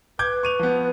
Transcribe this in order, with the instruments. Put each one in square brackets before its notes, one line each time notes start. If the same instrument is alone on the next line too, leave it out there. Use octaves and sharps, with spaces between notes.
[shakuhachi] B4 [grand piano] D6 G6 G#6
[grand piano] C#6 D#7 F7
F3 B3